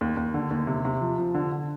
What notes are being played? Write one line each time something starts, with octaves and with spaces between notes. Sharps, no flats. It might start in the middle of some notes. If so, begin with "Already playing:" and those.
D#2
D#2
D3
D#2
C3
C3
F3
F3
D3
D3